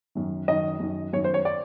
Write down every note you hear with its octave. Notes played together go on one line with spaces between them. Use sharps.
F#2 D#3
F#2 D#3 D#5
F#2 D#3
F#2 D#3 C#5
C5
C#5
D5